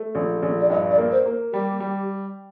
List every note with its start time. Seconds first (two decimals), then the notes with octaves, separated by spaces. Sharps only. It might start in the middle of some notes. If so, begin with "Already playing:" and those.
Already playing: A3
0.15 A#1
0.43 A#1
0.60 D5
0.70 G2 D#5
0.91 D5
0.97 A#3
1.12 C5
1.26 A#3
1.53 G3 G4
1.80 G3